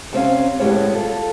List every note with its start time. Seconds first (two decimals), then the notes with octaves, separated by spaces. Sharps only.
0.13 C3 C4 C#4 F5
0.60 D2 A2 G3 G#3 B3 C#5
0.94 F4 A4